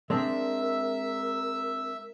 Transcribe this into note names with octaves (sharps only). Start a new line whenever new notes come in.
G#3 C4 D4 A#4 E5